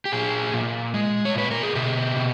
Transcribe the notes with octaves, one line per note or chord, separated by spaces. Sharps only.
G4
A#2 G#4
A#2
G#3
C#5
A#2 B4
A#4
G#4
B2 G4
B2